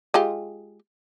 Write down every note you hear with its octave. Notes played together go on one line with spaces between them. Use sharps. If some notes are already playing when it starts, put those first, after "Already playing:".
G#3 F4 G4